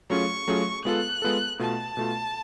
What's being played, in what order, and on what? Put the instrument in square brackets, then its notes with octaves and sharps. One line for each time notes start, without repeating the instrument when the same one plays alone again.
[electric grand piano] F#3 A3 C#4 F4 G#4 [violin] C#6
[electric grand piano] F#3 A3 C#4 F4 G#4
[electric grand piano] G#3 B3 F4 A4 [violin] F#6
[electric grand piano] G#3 B3 F4 A4
[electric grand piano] B2 A3 F4 [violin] A5
[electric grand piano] B2 A3 F4